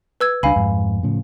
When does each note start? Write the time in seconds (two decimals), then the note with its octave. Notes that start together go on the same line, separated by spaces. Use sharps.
0.20 B4 E6 G#6
0.43 C#2 G3 D4 F5 G#5 B5
0.56 F2 G#2
1.03 A2 C#3 F3